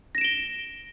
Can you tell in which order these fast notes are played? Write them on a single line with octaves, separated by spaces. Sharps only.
A#6 E7 D7 G7